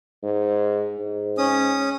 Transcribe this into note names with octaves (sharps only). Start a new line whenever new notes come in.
G#2
G#2
C#4 D#6